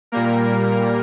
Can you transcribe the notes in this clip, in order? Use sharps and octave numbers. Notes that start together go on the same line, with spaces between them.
A#2 G3 A#3 A#4